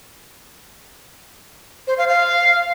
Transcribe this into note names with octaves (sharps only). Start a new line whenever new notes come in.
C5
F5
F5